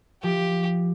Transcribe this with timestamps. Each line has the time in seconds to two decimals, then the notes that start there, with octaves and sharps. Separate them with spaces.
0.23 F3 G4